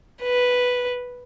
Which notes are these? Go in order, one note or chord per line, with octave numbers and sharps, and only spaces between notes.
B4